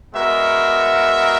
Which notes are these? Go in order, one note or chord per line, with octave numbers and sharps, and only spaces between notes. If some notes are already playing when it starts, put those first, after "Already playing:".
G#3 B3 F#4 A#4 E5